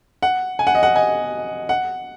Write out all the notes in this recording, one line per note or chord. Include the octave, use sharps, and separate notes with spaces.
F#5
G#5
F#5
D#5
F#5
D#5 G#5
F#5